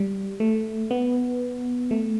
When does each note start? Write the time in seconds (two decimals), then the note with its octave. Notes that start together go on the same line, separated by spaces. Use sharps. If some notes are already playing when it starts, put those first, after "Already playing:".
Already playing: G3
0.40 A3
0.91 B3
1.91 A3